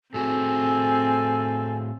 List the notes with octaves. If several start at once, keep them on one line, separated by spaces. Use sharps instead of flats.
A2 C4 F#4 G#4 A4 G#5